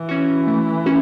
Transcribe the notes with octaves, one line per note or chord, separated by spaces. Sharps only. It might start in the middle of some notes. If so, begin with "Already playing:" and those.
Already playing: E3
C#4 F#4
A3
C#4 F#4